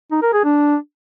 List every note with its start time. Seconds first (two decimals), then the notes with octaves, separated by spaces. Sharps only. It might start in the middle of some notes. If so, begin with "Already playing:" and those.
0.11 D#4
0.22 A#4
0.33 G#4
0.44 D4